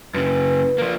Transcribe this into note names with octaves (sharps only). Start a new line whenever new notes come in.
F#2 C#3 B4
F3 A#3